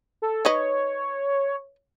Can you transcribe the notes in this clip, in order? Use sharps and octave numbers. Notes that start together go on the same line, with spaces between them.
A4
D#4 B4 C#5 D#5